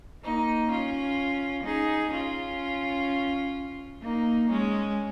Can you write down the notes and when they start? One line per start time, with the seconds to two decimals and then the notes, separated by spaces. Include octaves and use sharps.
0.22 A#3 D#4
0.69 C#4 F4
1.64 D#4 G#4
2.12 C#4 F4
4.01 A#3 D#4
4.49 G#3 C#4